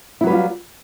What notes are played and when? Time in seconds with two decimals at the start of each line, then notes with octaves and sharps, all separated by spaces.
0.21 E4
0.24 F#3
0.27 B4
0.30 G3
0.33 F4